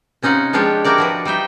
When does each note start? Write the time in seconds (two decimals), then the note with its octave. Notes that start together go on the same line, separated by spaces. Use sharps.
0.22 C3 C#4 D#4 F4 F#5
0.53 F3 G#3 D4 F4 G4 C#5
0.84 E4 F#4 G4 A#4 D5
0.98 F3 F#4 B4
1.25 G3 D#4 E5 G5